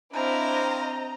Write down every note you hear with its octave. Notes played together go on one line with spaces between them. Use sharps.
C4 D4 E4 C5 D#5 F5 A#5